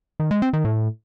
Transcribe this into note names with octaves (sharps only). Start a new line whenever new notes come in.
D#3
G#3
C4
D#3
A2